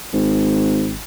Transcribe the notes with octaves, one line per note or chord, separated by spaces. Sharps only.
G#1